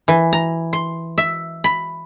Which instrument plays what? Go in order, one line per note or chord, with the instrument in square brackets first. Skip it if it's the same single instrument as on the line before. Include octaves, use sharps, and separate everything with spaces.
[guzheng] E3
A#5
C6
E5
B5